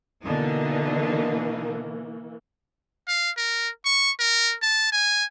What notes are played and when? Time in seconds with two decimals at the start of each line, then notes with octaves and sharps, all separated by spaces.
0.24 B2 D3 E3 A#3 D#4
3.08 F5
3.37 A#4
3.85 C#6
4.19 A#4
4.62 A5
4.92 G#5